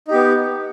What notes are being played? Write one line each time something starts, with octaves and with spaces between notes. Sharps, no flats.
B3 D#4 G4